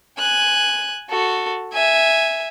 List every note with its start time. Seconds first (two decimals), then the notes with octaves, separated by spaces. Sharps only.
0.19 G#5 F#6
1.10 F#4 A4
1.73 E5 G#5